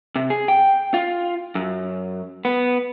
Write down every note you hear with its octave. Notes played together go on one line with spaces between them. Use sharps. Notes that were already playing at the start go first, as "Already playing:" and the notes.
C3
G#4
G5
F4
F#2
B3